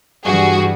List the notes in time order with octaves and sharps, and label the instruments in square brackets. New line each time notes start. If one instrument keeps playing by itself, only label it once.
[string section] G2 E3 G3 F#4 G#4